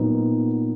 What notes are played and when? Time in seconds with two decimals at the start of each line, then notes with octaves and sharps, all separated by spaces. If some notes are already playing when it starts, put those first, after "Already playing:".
Already playing: A#2 F#3 B3 D#4